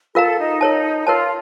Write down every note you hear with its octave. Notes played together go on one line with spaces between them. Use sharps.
F4 A4 A#4 F5 A#5
D#4
A#4 C#5 A5
F4 A#4 C#5 A5